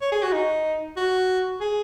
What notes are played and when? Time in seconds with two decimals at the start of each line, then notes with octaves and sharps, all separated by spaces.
0.02 C#5
0.12 G#4
0.23 F#4
0.33 D#4
0.97 F#4
1.60 G#4